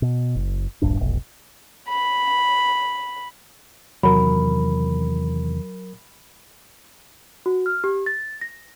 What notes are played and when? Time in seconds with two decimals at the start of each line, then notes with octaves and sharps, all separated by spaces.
0.02 B2
0.35 F#1
0.82 D1 A#1 G2 D4
1.00 F1 B1
1.89 B5
4.03 E2 C3 D#3 F#3 A#4 B5
7.46 F#4
7.66 F6
7.84 G4
8.06 A6
8.41 A#6